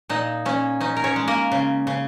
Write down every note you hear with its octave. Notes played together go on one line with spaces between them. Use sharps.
A#2 D#4
A#2 C#4
C#4 D#4
A#4
C#4 C#5
G#3
A#3 A#4
C#3
C#3